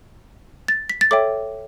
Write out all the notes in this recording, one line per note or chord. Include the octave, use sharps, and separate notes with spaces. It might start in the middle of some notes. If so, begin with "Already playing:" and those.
A6
B6
A6
A4 C#5 E5 G5 D6